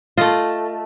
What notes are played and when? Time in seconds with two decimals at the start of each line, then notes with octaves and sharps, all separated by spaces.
0.18 A3 F4 D#5